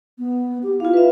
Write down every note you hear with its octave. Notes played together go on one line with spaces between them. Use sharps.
B3
G4
E4 F4 F5
B4 E5